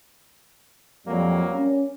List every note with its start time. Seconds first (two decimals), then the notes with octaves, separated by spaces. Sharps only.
1.07 F2 F#3 G3 A#3
1.53 C#4